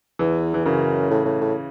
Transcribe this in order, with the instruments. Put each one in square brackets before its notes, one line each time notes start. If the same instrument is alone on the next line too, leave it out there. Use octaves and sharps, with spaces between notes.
[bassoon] E2 [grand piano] E3
[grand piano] E3
[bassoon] F#2 [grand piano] C#3
[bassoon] A2
A2
A2